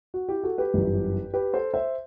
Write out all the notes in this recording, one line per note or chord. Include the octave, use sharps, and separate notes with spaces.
F#4
E4 G4
F#4 A4
G4 B4
G1 F#2 E3 G3
G4 B4
A4 C5
C5 E5